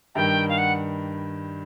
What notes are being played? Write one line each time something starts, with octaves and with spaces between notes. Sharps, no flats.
G2 D#3 G3 G5
F5
F#5